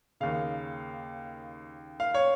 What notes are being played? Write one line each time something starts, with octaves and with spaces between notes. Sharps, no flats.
D#2 C#3 F5
F5
C#5